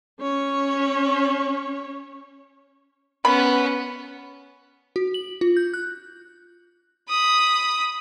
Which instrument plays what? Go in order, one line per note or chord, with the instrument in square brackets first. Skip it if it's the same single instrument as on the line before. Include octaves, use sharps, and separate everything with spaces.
[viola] C#4 C#5
[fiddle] B3 C#4 [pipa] B5
[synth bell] F#4
F#7
F4
G6
F#6
[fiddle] B5 D#6